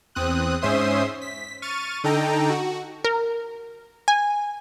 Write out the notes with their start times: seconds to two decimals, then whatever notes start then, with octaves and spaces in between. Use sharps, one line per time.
0.15 E2 C4 D#6 F#6
0.62 G#2 C#4 C5 E5 C6 D#6
1.21 B6
1.62 C#6 F6 A6 D#7
2.04 D3 D#4 A4 G5 A#5
2.50 F#4
3.05 A#4
4.08 G#5